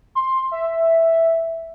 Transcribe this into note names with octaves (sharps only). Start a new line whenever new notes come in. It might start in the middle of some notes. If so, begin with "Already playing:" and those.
C6
E5